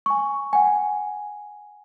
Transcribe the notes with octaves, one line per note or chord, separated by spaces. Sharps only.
G#5 C#6
F#5 G#5